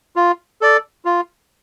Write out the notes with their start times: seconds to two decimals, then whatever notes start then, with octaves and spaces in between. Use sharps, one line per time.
0.16 F4
0.61 A4 D5
1.05 F4